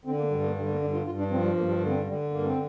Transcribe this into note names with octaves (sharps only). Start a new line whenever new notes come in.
D3 C4
A#3
G2 G3
A#3
D3 G3
A#3
G2 D4
F4
G2 F4
D4
F3 C4
G3
G2 A#3
G3
D3 A#3
C4
D4
D3 G3
G2 A#3
C4